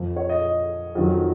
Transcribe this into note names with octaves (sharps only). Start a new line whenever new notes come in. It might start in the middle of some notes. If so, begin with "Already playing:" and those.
Already playing: F2 F3
C#5
D#5
F2 D#3 F#3